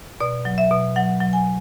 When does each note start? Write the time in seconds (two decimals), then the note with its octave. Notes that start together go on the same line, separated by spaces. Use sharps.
0.20 B2 D5
0.45 F#3
0.58 E5
0.71 B2
0.96 F#3 F#5
1.21 F#3
1.33 G#5